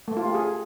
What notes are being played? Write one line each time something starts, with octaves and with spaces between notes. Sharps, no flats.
A3
F4
G4
G#4